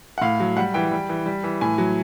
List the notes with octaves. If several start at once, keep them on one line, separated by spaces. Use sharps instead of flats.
F#5
A2 F5
F#3
G3 F#5
E3 G5
G3
E3
G3
E3
A2 G#5
F#3